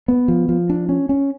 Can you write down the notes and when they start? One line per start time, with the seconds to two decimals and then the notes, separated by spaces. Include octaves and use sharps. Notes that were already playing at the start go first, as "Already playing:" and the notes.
0.08 B3
0.28 F3
0.49 F3
0.70 D4
0.89 C#4
1.09 C#4